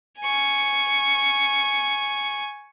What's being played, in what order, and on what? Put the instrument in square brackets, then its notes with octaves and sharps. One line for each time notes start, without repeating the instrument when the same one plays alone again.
[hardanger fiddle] G#5 C#6